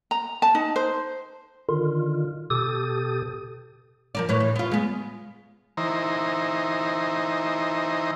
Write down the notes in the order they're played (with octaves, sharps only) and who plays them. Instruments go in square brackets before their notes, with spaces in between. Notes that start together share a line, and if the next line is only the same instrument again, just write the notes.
[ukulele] A#5
A5
D#4
C5
[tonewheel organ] D3 D#3 F4
B2 G4 A4 D#6
[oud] F3 A#4 D5
A2 B4 C#5
E3
B3 F4
G#3 B3
[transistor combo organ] E3 D#4 C5 A#5